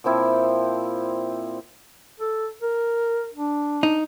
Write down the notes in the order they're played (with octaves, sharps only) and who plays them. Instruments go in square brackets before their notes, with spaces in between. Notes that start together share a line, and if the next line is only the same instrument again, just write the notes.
[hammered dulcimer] A#2 F3 C4 E4
[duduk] A4
A#4
D4
[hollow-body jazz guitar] D#4